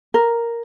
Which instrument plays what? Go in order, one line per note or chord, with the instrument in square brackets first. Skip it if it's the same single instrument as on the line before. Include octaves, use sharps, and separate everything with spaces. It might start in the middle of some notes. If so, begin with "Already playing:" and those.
[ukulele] A#4